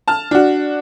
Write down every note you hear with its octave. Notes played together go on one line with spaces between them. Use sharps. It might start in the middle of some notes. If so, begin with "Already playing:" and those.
A5 F6
D4 F#4